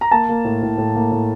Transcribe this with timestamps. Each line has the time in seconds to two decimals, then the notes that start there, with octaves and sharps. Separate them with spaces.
0.01 A#5
0.11 A#3 A5
0.29 A#3
0.44 A2
0.62 A2
0.78 A2
0.95 A#3
1.12 A2